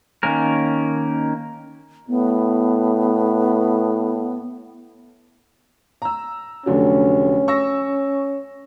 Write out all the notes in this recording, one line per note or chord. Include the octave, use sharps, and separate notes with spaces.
D#3 A#3 C#4 A#4
A2 B3
A#5 E6
F1 D3 F#3 C#4
C#6 E6 A#6